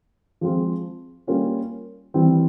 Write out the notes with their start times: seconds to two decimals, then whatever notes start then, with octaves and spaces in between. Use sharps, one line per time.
0.41 F3 G#3 C4 F4 G#4
1.27 G3 A#3 C#4 F4
2.14 E3 G3 C4